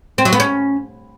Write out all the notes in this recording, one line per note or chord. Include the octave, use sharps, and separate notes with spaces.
C4
F#3
B3
C#4